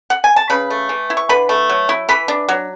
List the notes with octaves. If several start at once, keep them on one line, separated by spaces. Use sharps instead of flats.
F#5
G#5
A5
C#3 B4 B5
A3
E3
E4
C#6
D3 B4 B5
A3
F#3
E4
E3 B4 B5
D4
F#3